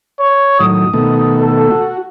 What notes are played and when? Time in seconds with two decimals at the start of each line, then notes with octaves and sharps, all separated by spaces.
0.20 C#5
0.59 A2 D#3 F#3 D#6
0.93 B2 D#3 A3
1.41 A4
1.71 F#4